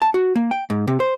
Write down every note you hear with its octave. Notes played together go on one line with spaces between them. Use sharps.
A5
F#4
A#3
G5
G#2
C3
C5